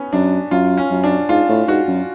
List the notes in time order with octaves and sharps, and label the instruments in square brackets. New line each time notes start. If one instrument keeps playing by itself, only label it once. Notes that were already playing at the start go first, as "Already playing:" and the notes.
Already playing: [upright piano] B3 C#4
[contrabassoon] F#2 [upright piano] D4
[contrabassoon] F#2 [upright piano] F4
[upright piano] C#4
[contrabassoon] F#2
[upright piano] D4
[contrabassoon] G#2 [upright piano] F4
[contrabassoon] A2
[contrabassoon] G#2 [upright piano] F#4
[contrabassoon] F#2